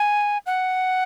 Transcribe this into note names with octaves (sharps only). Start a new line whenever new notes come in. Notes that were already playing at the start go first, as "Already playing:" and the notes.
Already playing: G#5
F#5